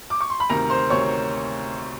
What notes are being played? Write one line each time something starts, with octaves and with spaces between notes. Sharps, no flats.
D6
C#6
C6
B5
D2 C3 D#3 A#4 A#5
C5 C6
D2 C3 D#3 C#5 C#6